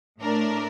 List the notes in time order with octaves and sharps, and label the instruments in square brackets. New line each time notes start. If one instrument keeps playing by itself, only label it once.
[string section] A2 A3 D4 A#4